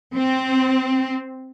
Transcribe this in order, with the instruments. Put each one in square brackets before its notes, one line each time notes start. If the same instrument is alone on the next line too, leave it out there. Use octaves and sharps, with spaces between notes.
[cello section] C4